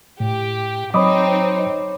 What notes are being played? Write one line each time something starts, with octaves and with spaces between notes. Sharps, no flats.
A2 G4
F#3 C4 D#4 C#5 D#5 B5 D6 D#6